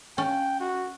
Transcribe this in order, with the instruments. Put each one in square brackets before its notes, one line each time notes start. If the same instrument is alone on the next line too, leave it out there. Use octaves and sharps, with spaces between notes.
[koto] C#4 [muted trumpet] G5
[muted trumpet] F#4